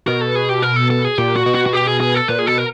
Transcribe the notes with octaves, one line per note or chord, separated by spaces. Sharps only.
B2 A#4
A4
G#4
G4
A#4
A4
A4
G#4
A#2 G4
F#4
B2
F#4
F#4
G4
G#4
G#4
A4
A#2 B4
G#4
B2 A4
A#4